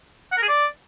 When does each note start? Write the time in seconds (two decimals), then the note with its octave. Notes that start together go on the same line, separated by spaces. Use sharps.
0.32 F#5
0.37 A#4
0.43 G#4
0.48 D5